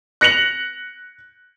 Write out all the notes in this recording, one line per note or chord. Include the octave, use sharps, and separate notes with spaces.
F#6 A#6 C#7 F7 F#7